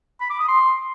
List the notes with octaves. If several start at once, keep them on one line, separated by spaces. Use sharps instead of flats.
B5
D6
D#6
C6